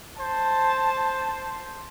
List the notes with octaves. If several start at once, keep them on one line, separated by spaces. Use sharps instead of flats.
C5 A5